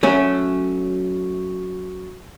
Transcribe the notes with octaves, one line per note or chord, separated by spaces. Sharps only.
F#3 A3 C#4